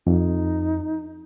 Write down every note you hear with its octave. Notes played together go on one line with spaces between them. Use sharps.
F2 D#4